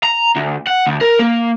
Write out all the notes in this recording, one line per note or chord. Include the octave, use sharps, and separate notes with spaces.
A#5
D2
F#5
D2
A#4
A#3